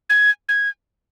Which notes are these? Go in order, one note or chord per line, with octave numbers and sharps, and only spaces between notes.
G#6
G#6